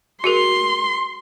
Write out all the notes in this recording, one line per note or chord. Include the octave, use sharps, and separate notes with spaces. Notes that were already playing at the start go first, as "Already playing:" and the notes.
F#4 G#4 A#4 C6